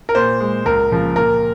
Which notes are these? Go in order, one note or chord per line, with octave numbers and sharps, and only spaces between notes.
A#4
A#2 C5
G#3
C#2 A#4
C#3 F3 A#3
A#2 A#4